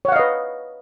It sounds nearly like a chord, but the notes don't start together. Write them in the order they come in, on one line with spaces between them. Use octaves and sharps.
C#5 F#5 F5 D#5 B4